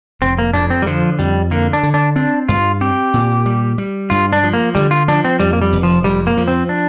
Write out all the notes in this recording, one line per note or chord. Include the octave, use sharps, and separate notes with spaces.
F1 C4
A#3
F2 D4
C4
G3
D3 F3
F2 G3
D3 A#3
D4
D3
D4
C4 D4
G2 F4
C4 G4
A#2
G3
G3
G2 F4
D4
F3
A#3
D3 G3
F4
F3 D4
C4
F2 G3
A#3
G3
F1
F3
F2 G3
A#3
F3
C4
D4